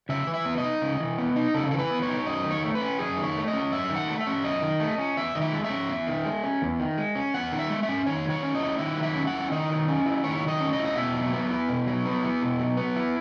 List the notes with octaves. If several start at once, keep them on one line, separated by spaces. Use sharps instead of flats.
C#3 E5
E3
E5
B3
D#5
D#4
C#3
E3
B3
D#4
C#3 A4
E3 A4
B4
B3
C#5
D#4
F#2 D#5
D#3
C#5
A3
B4
C#4
F#2 G#4
D#3
C#5
A3
D#5
C#4
F#2 E5
D#3
F#5
A3
E5
C#4
F#2 D#5
D#3
A3
C#4
E2 E5
D#3 D#5
E5
G#3
E5
C#4
E2
D#3
G#3
C#4
E2
D#3
G#3
C#4
E2 F#5
D#3
E5
G#3
E5
C#4
D#3 C#5
F#3
C#5
C#4
D#5
E4
D#3 E5
F#3
E5
C#4
F#5
E4
D#3 D#5
F#3
C#4
E4
D#3 C#5
F#3
D#5
C#4
D#5
E4
D#5
B2 E5
F#3
B3
E4
B2
F#3
B3
E4
B2
F#3
B3
E4